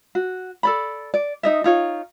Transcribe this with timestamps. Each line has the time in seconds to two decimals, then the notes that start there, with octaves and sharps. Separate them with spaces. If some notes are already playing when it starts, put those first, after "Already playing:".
0.15 F#4
0.63 A4 D5 B5
1.14 D5
1.43 D#4 D#5 E5
1.64 D#4 F4 C#5